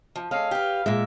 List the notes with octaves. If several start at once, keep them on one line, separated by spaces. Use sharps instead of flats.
F3
G#3 C#4 A4 F5
G4 B4
A#2 G#3 E5